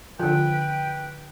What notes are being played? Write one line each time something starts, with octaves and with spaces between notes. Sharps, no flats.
D3 F3 B4 G5